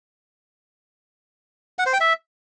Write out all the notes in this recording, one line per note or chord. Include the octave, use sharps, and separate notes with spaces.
F#5
C5
G5
E5